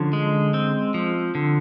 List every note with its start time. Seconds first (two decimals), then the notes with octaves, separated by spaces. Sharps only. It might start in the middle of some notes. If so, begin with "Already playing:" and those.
Already playing: D3 F3 C#4
0.13 G#3
0.54 C4
0.94 F3
1.35 D3